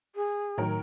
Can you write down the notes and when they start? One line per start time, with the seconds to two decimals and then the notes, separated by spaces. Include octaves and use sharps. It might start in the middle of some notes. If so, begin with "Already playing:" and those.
0.16 G#4
0.58 A2 D#3 F#3 A#4